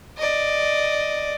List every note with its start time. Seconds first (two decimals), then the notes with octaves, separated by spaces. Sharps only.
0.17 D5 D#5